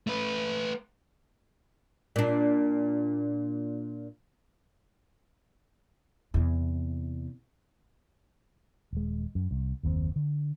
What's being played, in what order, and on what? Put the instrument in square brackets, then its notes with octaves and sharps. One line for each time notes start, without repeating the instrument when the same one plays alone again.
[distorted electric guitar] A3 B4
[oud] A#2 D4
[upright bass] E2 C3
[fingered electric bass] D#1 G#3
F#2
C2
F#1 D#2 C3 C4
D3